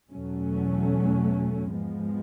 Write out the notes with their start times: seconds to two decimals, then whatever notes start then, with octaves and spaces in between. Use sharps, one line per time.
0.11 E2 B2 F#3 A3 C#4
1.73 G#2 F3 G#3 B3